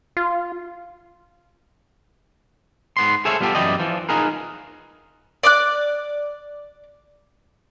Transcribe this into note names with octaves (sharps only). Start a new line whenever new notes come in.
F4
G#2 B3 C6
G#4 A4 C5 C#5 E5 F5
G3 B3 F4 G4 A4
F#2 E3 E4 G4 D5 D#5
E3 F3
D#4 F4 G#4 A#4 B4
D5 D6 F#6